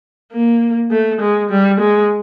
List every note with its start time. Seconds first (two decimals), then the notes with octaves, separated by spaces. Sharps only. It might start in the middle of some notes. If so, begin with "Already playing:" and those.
0.32 A#3
0.91 A3
1.21 G#3
1.50 G3
1.80 G#3